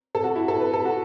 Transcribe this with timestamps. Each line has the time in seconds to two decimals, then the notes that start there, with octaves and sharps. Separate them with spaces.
0.15 A4
0.24 F#4
0.35 E4
0.48 A4
0.60 B4
0.73 A4
0.85 F#4